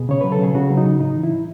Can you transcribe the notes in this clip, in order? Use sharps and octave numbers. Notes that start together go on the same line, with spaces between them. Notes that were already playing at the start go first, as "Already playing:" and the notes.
Already playing: B2 G#4
C#3 C#5
F#3 B4
A4
C#3 G#4
C#3 F#4
F#3
D#4
C#3
A2 D#4
E3
E4
A2